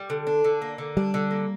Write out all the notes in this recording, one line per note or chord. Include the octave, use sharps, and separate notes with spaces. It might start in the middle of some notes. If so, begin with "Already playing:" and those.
Already playing: G3
D3
D4
D3
A#3
D3
G3 D4
D3
A#3